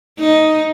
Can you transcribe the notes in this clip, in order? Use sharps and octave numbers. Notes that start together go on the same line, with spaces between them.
D#4